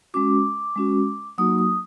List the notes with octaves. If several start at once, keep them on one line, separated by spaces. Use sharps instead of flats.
G#3 C#4 F#4 D6
G#3 C#4 F#4
F#3 A#3 D#4 F#4 D#6
D#6